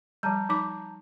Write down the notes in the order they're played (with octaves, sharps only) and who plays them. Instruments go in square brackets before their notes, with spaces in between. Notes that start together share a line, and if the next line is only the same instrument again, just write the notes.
[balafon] F3 G3 [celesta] A5 A#5 G6
[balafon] F3 D#4 D6